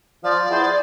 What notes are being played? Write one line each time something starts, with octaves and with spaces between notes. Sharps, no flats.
F3 D5
B3 E4 G#4 C5